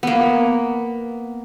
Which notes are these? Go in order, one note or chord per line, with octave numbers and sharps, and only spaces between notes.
A#3 B3